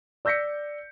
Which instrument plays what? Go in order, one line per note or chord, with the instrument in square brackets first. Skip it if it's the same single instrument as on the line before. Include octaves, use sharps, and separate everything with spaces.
[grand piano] D5 E6 G6 A#6 B6 C#7